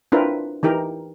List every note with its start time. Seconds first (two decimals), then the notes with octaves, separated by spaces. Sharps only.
0.12 C4 D4 E4 F4 A#4 B4
0.63 E3 D#4 G4 A#4